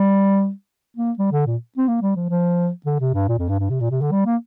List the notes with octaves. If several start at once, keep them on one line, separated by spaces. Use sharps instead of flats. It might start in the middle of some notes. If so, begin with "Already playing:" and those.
Already playing: G3
A#3
G3
D3
A#2
C4
A#3
G3
F3
F3
D3
C3
G2
A#2
F2
G2
G2
C3
A#2
C3
D3
G3
A#3